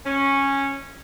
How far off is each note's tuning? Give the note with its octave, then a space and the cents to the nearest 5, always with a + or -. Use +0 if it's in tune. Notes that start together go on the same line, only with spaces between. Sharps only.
C#4 -10